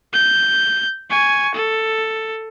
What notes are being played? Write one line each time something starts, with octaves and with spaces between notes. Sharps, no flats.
G6
G#5 C#6
A4